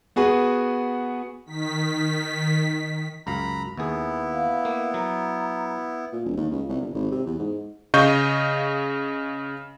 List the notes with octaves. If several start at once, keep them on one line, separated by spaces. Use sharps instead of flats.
B3 F#4 G#4 B4
D#3 B6
C#2 F#2 F5 A#5 B5
D#2 B3 E4 G#4
F5
A#3
F#3 A#5
A#2
E1
D#2
C#2
C2
G1
G#1
C3
E2
G#2
C#3 D#5 F5 C#6 G6